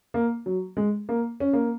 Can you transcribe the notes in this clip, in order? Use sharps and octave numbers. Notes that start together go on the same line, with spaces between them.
A#3
F#3
G#3
A#3
C#4
A#3